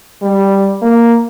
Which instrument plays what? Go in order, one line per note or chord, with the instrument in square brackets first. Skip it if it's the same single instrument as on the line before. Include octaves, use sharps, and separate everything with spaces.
[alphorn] G3
A#3